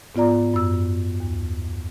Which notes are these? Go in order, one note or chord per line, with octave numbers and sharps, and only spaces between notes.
G#2 B3 F4 D5 A#5
F#2 E6
D#2